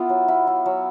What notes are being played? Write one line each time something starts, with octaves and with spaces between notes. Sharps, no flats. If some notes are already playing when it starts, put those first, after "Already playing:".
Already playing: B3 E4 F4
F#3
E4
E4
F#3